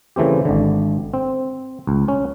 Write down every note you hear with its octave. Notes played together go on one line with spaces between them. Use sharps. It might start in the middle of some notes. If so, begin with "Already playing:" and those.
C#3 E3 A3 C4 G4
G#1 D3
C4
C#2
C#4